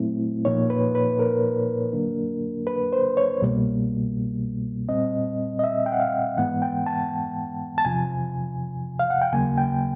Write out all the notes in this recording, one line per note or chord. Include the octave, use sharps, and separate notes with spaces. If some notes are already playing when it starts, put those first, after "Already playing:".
Already playing: A#2 F#3 A3 C4 E4
A#2 F3 A#3 D#4 C#5
B4
B4
A#4
D3 F#3 A#3 D4
B4
C5
C#5
C2 B2 G3 A#3
A#2 G3 C4 D#5
D#5
E5
G5
F#5
F5
G#2 E3 G#3 B3 F#5
G5
A5
A5
E2 C3 F3 G#5
F5
F#5
G5
D#2 C#3 F#3 A#3 G#5
G5